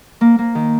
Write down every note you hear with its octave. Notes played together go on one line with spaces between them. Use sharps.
A#3
A#3
D#3